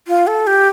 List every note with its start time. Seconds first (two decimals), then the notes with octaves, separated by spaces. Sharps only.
0.08 F4
0.27 A4
0.47 G4